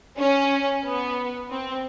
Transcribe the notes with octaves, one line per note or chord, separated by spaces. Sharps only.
C#4
B3
C4